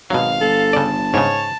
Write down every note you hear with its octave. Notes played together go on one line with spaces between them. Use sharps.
G#1 B2 F#3 F5
G1 A4
C#3 D5 A5
G#2 C#3 C#5